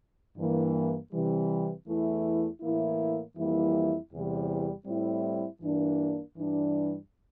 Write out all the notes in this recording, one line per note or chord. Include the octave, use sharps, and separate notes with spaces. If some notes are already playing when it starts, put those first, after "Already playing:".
G2 E3 A#3
C3 E3 G3
E2 E3 A3 E4
A2 E3 A#3 E4
F2 E3 G3 A#3 E4
E2 C3 E3 G3
A2 G3 C4 E4
G2 E3 A#3 D4
G2 E3 G3 D4